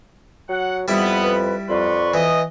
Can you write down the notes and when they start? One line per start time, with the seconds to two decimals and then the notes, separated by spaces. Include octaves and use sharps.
0.49 F#3 F#5
0.88 F2 G3 B3 E4
1.23 B4
1.69 F2 B4 D5 C6 C#6
2.14 E3 D#5